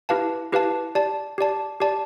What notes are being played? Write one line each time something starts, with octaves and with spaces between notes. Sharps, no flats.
E4 G4 B4 F5 A5
E4 G4 B4 F5 A5
G4 D5 A5
G4 D5 A5
G4 D5 A5